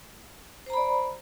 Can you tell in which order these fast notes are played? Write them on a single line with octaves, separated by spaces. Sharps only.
C5 A#5 B5 D5